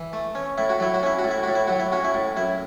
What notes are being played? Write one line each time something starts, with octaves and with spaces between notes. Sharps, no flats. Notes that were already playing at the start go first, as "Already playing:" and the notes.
Already playing: E3
A3
C#4
A2 E4
F#4
F#3 E4
F#4
C#4 E4
F#4
A2
E4
A2 F#4
E4
F#3 F#4
E4
C#4 F#4
E4
A2
F#2 E4